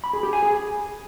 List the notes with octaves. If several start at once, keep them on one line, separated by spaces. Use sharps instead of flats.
B5
G#4
G4
G#5
G#4